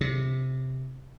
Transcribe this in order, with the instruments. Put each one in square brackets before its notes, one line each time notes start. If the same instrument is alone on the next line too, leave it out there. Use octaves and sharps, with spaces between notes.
[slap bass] C3